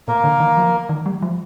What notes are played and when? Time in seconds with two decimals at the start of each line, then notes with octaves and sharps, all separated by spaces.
0.08 A#2 A#3 A#4
0.24 D3
0.40 D#3
0.57 F3
0.89 D#3
1.06 G3
1.22 F3